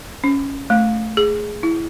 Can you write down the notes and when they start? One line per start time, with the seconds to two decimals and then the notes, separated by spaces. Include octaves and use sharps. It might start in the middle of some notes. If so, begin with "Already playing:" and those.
0.24 C#4
0.70 A3
1.17 G#4
1.63 E4